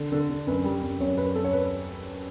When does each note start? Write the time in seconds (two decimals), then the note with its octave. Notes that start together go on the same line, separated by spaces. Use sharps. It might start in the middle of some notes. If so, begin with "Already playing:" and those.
Already playing: D3
0.12 D3
0.29 D3
0.47 F#2 B4
0.64 G3
0.82 F#2
1.00 F#2 C#5
1.17 F#2 B4
1.35 F#2 A4
1.44 C#5
1.53 B4